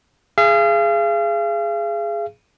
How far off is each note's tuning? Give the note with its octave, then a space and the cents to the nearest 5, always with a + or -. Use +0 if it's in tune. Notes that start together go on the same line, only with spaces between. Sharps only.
G#4 +0 F5 -40